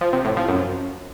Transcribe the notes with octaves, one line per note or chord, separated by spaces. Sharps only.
F3
C3
A2
F3
F#2